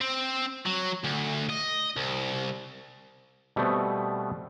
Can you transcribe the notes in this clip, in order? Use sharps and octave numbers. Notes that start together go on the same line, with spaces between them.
C4
F#3
D2
D#5
C2
B2 G3 A3 B3 C4